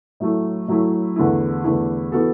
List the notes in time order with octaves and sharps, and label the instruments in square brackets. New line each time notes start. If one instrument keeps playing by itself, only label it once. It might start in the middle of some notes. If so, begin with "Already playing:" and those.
[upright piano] A2 F#3 A3 E4
A2 F#3 A3 E4
E2 D3 A3 E4
E2 D3 A3 E4
E3 B3 F#4 A4